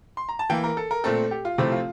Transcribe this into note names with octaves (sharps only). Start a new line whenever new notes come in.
C6
A#5
A5
E3 A#3 G5
A#4
A4
A#4
A#2 A3 C4 A4
G4
F4
C3 F3 A3 C4 E4
F4